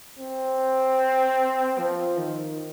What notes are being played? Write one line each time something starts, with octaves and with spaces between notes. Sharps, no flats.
C4
F3
D#3